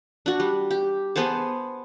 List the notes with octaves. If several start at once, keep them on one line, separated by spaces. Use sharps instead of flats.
D4 F#4
G3
G4
B3 G#4 C5 A5